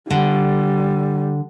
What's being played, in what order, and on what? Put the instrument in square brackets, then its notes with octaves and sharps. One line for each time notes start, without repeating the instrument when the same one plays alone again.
[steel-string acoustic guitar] D3 [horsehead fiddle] G3